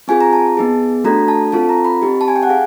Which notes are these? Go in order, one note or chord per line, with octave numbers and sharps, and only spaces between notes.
C4 F4 G#4 G#5
A#5
A5
B3 D#4 G#4
A3 D4 F#4 A4 A#5
A5
C4 F4 A4 A5
A#5
B5
C4 D#4 G4
A5
G#5
G5
F#5
G#4 F5